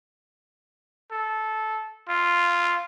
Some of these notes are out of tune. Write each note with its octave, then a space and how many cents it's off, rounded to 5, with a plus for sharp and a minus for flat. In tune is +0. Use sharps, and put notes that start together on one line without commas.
A4 -15
F4 -5